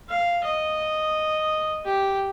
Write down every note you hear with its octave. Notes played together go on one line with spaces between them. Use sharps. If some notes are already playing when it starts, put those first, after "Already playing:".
F5
D#5
G4